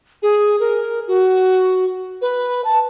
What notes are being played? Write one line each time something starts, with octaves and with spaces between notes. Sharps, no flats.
G#4
A#4
F#4
B4
A5